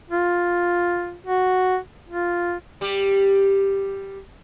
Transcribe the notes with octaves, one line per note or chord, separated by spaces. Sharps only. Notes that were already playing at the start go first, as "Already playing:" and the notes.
F4
F#4
F4
G3 G4